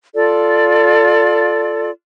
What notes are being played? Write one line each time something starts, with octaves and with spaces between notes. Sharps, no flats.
F4 A4 D5